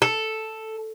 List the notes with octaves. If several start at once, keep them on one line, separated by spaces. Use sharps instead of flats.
A4